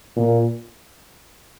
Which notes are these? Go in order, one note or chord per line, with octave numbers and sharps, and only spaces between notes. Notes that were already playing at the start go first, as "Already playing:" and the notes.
A#2